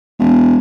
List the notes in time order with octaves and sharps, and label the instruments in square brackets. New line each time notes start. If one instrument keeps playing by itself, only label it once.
[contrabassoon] E1